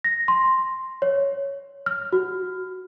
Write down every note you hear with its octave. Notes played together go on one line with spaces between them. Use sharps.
A#6
C6
C#5
F6
F#4